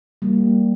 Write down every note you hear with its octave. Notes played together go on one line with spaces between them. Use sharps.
G3 A#3